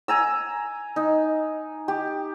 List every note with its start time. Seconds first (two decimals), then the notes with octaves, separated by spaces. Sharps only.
0.08 G#5 A#5 E6
0.96 D#4
1.88 G4